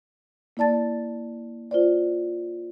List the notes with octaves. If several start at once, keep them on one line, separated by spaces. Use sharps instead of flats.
A#3 E4 D5 A5 A6
F4 C5 D5